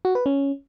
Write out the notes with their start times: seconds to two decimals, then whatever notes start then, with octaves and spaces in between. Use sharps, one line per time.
0.05 F#4
0.15 B4
0.26 C#4